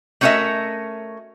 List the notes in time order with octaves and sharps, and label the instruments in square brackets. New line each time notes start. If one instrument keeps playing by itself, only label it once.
[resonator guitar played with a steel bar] A3 C#4 F#4 A#4 D#5 E5